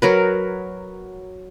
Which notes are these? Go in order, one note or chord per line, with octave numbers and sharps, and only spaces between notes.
F#3 A#4 B4